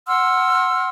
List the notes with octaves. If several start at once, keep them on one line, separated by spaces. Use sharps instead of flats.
F#5 C6 E6 F6